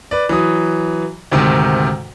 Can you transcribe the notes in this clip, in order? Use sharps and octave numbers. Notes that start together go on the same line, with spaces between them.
B4 D5
E3 F#3 D#6
D2 G#2 C3 D#3